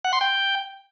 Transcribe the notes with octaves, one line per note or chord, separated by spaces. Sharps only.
F#5
C6
G5